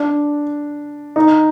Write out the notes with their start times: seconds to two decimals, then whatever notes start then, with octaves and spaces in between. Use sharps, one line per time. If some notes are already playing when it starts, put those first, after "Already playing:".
Already playing: D4
1.16 D#4